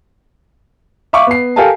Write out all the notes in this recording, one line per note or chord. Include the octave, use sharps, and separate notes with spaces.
E5 F5 C#6 D6
B3 C7
G4 A4 A#4 F5 G#5 A5